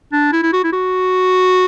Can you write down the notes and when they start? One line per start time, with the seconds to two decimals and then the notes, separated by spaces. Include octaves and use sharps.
0.12 D4
0.32 E4
0.43 E4
0.53 F#4
0.64 E4
0.73 F#4